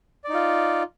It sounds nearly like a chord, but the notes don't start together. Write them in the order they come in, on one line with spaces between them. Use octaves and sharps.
D5 D#4 F4